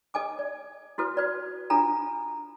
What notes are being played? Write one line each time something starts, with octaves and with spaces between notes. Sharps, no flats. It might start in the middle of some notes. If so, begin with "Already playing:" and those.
A4 D#5 G#5 D6
D5
E4 F#4 A4 B4
F#4 B4 D5
D4 F4 A4 G#5 A#5